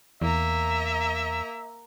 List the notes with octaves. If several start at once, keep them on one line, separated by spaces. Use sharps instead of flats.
E2 A#3 E5 A#5